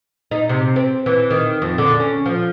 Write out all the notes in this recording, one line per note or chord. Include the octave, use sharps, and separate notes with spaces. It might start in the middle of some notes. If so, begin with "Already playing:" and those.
D#4
C3
C4
E3
D#3
F2
D3
C#4
F3